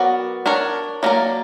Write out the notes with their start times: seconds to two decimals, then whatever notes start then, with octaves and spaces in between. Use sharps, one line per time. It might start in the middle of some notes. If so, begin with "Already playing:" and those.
Already playing: F#3 B3 F#4 A#4 D5
0.46 D4 A#4 C#5
1.03 F#3 A#3 D4 A#4 D5